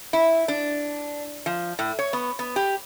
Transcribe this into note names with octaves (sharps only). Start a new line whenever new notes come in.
E4
D4
F3
A2
C#5
B3
B3
G4